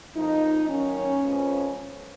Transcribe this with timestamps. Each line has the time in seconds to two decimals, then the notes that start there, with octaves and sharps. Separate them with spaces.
0.15 F2 F3 A#3 D#4
0.69 F#2 D#3 F#3 A#3 C#4
1.23 F2 F3 G#3 B3